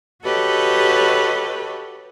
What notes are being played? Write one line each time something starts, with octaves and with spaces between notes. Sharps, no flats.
F#4 G4 A4 B4 C#5 D#5